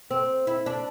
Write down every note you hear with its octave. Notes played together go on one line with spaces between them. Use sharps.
C4
E4
D4